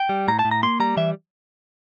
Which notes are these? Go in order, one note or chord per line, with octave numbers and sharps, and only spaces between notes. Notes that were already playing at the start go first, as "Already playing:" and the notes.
Already playing: G5
G3
A2 A#5
A5
A2
A#5
A#3 C6
G3 A#5
E3 E5